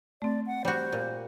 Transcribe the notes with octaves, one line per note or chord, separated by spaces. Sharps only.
A3 C4 D5
F#5
G3 F#4 C5
A#2